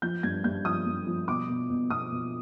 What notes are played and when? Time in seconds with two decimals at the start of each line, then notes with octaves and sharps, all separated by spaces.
0.02 F3 G6
0.23 G2 G#6
0.44 G2 G6
0.65 F3 D#6
0.86 G2
1.07 F3
1.28 B2 D6
1.49 B2
1.70 B2
1.90 B2 D#6
2.12 B2